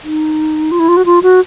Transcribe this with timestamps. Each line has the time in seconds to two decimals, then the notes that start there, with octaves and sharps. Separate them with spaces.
0.04 D#4
0.71 F4
0.79 E4
0.88 F4
0.97 F#4
1.06 F4
1.23 F#4